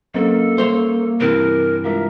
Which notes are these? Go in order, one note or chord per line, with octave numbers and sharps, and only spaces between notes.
F#3 A#3 C#4 A4 C5
G3 C5 C#5 C6
G2 C3 E3 A#4
G#3 F4 A#4 E5